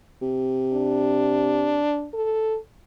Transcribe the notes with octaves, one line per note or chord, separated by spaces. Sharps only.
C3
D4
A4